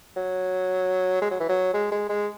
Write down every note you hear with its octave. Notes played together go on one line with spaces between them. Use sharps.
F#3
G#3
F#3
E3
F#3
G#3
G#3
G#3